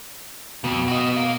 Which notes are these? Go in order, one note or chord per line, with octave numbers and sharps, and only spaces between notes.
F2 B2
F#4 D#5
A#4 F5